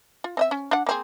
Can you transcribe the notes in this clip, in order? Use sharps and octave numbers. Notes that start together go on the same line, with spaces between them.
F4
C4 D#5 E5
C#4
D4 F#5
A#3 C4 G#4